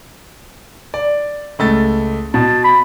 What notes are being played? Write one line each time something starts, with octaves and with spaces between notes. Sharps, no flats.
D5
C#2 A3 A6
B2 A5
B5